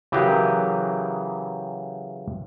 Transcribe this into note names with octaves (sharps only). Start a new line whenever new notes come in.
C#3 E3 F#3 G4 G#4 A#4